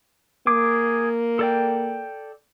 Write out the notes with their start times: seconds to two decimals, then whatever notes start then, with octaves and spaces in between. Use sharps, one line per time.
0.47 A#3 G#4 D6
1.39 A4 D5 G5